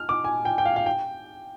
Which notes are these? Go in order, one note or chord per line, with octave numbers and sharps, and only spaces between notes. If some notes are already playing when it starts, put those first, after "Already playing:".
Already playing: F6
D6
G#5
G5
G5
F5
F5
G5